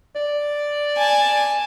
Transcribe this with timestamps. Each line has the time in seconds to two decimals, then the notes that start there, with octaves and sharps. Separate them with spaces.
0.15 D5
0.97 G#5 A5